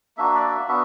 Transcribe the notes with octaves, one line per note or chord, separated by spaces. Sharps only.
A#3 D4 F#4 E5
D5
E5
B3 D4 F#4 E5